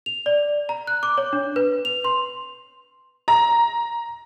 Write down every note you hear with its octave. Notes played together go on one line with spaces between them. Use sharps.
F7
D5
A#5
F#6
D6
C#5
D4
B4
F7
C6
A#5